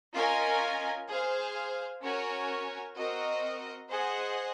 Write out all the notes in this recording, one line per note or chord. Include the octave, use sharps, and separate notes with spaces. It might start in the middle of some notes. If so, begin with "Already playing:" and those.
C#4 F4 A#4 D#5 G#5
G#4 C5 F5
C#4 F#4 A#4 C#5 G#5
C4 F#4 A#4 D#5
G#4 C5 D#5 F#5